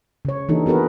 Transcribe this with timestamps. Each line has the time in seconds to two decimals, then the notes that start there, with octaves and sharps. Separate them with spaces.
0.25 C#3 C#5
0.49 E3 A#3 D4 D#4 G4 A4
0.66 B3 F#4 G#4 A#4 B4